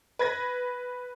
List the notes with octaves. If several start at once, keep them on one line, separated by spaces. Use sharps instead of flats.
B4 G#6 A#6